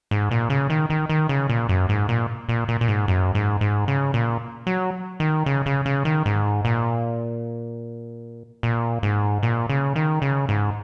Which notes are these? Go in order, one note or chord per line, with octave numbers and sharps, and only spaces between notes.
G#2
A#2
C#3
D#3
D#3
D#3
C#3
A#2
F#2
G#2
A#2
A#2
A#2
A#2
G#2
F#2
G#2
G#2
C#3
A#2
F#3
D#3
C#3
C#3
C#3
D#3
G#2
A#2
A#2
G#2
A#2
C#3
D#3
C#3
G#2